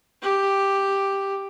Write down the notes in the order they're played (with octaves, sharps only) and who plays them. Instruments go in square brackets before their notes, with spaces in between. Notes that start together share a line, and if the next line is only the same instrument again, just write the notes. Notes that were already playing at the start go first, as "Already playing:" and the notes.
[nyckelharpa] G4